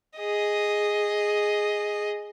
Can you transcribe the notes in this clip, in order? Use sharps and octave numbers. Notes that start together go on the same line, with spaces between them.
G#4 D#5